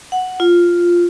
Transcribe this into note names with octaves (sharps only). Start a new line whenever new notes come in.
F#5
F4